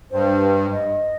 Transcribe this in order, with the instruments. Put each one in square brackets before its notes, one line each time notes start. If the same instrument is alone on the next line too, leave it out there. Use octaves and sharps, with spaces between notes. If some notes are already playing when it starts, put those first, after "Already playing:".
[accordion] G2 [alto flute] C5
[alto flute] D#5